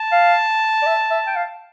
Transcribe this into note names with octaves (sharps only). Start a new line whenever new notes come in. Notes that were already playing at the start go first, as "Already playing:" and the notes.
Already playing: A5
F5
D5
E5
E5
G5
F5